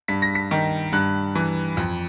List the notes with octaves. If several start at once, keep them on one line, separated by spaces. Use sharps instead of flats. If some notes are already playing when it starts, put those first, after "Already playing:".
G2 B6
A#6
B6
D#3
G2 F#6
E3
F2